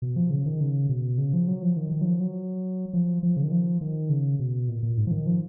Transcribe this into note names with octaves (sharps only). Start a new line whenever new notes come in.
B2
F3
C#3
D#3
C#3
B2
C#3
F3
F#3
F3
D#3
D#3
F#3
F3
F#3
F3
F3
C#3
D#3
F3
D#3
C#3
B2
A#2
A#2
G#2
F3
D#3
F3